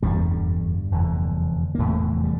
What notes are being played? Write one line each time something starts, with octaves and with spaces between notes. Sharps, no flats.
F1 E2 G2 D3 G3
F1 E2 D3
A#3
F1 E2 A2 D3 A3
G3